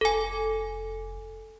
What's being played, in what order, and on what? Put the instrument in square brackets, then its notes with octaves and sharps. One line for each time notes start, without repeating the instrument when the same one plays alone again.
[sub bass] F1 [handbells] A4 G#5